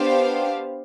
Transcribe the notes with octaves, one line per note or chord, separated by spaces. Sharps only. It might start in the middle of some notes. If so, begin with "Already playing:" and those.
Already playing: B3 D4 G4 C5 F5